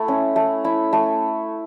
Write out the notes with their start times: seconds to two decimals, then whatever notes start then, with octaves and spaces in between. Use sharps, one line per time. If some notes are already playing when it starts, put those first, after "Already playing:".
Already playing: A3 E4
0.08 C#4
0.36 A3
0.65 E4
0.93 A3